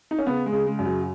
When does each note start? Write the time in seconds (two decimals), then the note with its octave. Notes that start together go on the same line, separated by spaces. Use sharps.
0.11 D#4
0.19 C#4
0.26 C#3 B3
0.46 G#3
0.53 C#3
0.66 G#3
0.79 F#2
0.85 F#3